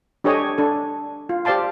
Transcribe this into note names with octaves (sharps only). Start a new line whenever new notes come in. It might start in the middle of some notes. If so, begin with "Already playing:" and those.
D4 G4 A4 C#5 D#5 G#5
D4 A4
F4
G4 C5 D5 F5 A5 C6